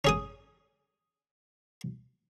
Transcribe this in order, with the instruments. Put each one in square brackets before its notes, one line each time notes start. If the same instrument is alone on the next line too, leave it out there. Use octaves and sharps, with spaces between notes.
[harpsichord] C#4 G#4 D#6